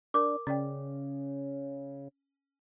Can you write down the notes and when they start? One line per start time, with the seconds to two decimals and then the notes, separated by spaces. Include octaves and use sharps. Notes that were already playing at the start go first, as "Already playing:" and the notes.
0.14 D4 A#4 D6
0.47 C#3 C#4 D5 G5